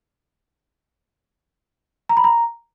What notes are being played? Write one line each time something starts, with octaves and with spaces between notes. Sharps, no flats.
A#5
B5
A#5